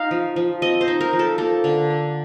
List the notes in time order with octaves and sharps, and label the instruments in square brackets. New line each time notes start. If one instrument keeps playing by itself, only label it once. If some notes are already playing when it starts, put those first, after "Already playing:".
Already playing: [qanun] D#4 F5
F3
F3
C4 D#5
C5
D#4
A#4
F3
A4
A#3 A4
D3
D4